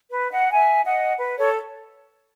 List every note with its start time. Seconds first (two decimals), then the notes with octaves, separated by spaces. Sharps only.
0.10 B4
0.32 D#5 F#5
0.53 E5 G#5
0.84 D#5 F#5
1.17 B4
1.38 A4 C#5